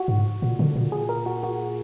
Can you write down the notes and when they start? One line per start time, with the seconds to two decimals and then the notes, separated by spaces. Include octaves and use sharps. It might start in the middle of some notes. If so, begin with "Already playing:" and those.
Already playing: F#4
0.08 G#2
0.42 A#2
0.59 D3
0.75 A#2
0.92 G#4
1.09 A#4
1.26 F#4
1.43 F#4